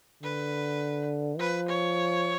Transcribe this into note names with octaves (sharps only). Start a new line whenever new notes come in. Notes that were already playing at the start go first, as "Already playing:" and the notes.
D3 B4
F3 B4
C#5